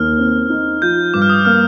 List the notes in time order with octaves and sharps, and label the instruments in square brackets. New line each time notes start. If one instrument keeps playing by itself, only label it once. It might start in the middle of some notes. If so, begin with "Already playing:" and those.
Already playing: [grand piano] D#2 [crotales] F6
[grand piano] C4
D#4
[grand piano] F3 [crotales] G6
[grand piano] G2 [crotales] D6
[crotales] F6
D#6
[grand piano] A#3 [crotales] F6